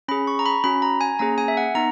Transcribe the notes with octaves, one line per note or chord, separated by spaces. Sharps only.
C#4 G#4 B5
C#6
A#5
B5
C#4 F#4 B5
A#5
G#5
A#3 C#4 G#4 A#5
G#5
E5
F#5
B3 D#4 A#5